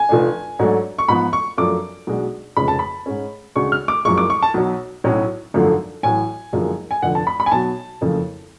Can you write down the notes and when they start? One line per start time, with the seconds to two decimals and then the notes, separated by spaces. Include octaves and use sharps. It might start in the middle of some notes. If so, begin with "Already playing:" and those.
Already playing: G#5
0.09 F1 F2 F3 A3 D4
0.59 G#2 F#3 A3 D4
0.98 C#6
1.08 G#2 F3 B3 B5
1.33 C#6
1.57 F#2 F3 A3 D4 D6
2.07 B1 B2 G#3 D4
2.56 F1 F2 C#3 G#3 C#4 B5
2.68 A5
2.79 B5
3.06 G#2 G#3 C#4
3.56 D2 C#3 G#3 D4 C#6
3.72 F6
3.88 D6
4.05 F#1 F#2 F3 G#3 C#6
4.18 D6
4.30 C#6
4.43 A5
4.54 B1 B2 F#3
5.04 B1 A2 F#3 C#4
5.54 G#1 F#2 D3 F3 A3
6.03 A1 A2 F#3 G#5
6.53 F#1 F#2 D3 F3 G#3
6.91 G#5
7.02 F1 F2 D3 F#5
7.15 A5
7.27 B5
7.40 B5
7.46 G#5
7.52 B1 B2 F#3 B3 A5
8.01 F#1 F2 C#3 F3 A3